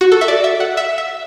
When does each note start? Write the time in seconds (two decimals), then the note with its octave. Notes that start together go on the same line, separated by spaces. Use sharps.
0.01 F#4
0.12 A4
0.21 E5
0.28 D5
0.44 E5
0.60 F#5
0.77 E5
0.98 E5